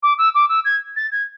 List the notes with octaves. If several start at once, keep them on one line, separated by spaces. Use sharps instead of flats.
D6
E6
D6
E6
G#6
A6
G#6